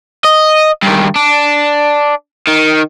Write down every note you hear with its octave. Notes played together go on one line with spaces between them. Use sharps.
D#5
G2 D#3
D4
D#3